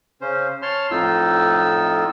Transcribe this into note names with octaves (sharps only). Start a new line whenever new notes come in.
C#3 C#4 C5
C#5 A5 C6 F6
F2 A2 D#4 F4 E6